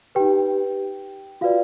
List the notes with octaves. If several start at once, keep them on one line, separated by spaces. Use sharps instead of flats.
D#4 G4 B4 G5
F4 F#4 B4 D5 F5